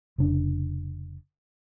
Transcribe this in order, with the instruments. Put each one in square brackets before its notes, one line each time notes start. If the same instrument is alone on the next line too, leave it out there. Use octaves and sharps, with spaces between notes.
[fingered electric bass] F1 C#3 D4